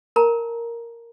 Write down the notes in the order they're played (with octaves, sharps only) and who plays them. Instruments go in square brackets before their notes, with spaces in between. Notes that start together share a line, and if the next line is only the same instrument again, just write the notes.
[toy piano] A#4 A5 A#5